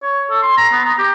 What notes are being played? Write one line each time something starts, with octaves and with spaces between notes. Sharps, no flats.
C#5
A4
C6
A#5
B3
A#5
G4